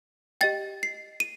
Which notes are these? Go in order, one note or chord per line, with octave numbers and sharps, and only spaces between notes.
G4 D#5 G5 A6
C7
D#7